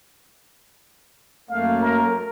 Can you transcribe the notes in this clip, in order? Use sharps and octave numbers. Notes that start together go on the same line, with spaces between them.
F#2 A3 A#3 F5
A#4